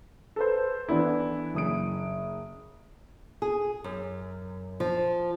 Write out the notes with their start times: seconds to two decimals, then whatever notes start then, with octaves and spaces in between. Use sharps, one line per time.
0.36 A4 B4 C5
0.89 E3 B3 D4 E4
1.54 F#1 D#6 D7
3.42 G#4
3.84 F#2
4.80 F3